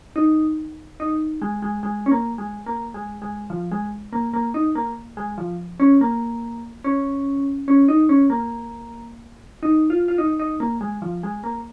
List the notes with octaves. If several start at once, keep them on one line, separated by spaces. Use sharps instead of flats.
D#4
D#4
G#3
G#3
G#3
C#4
A#3
G#3
A#3
G#3
G#3
F3
G#3
A#3
A#3
D#4
A#3
G#3
F3
C#4
A#3
C#4
C#4
D#4
C#4
A#3
D#4
F4
F4
D#4
D#4
A#3
G#3
F3
G#3
A#3